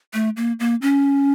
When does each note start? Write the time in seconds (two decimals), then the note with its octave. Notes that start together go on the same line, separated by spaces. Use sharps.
0.14 A3
0.37 A#3
0.60 A#3
0.82 C#4